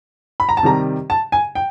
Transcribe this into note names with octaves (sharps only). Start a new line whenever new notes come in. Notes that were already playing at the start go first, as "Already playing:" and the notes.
B5
A#5
A5
C3 D#3 G3 A#5
A5
G#5
G5